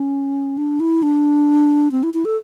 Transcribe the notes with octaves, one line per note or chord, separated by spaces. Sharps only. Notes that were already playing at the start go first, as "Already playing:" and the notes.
Already playing: C#4
D4
E4
D4
C4
E4
E4
A4